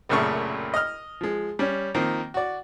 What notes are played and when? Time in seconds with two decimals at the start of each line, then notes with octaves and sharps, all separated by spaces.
0.09 C2 F#2 A#2 C#3 A3 C#6
0.74 D#5 F6
1.21 F3 G#3
1.59 G3 C#4
1.94 D#3 F3 A#3 C4
2.34 F#4 D5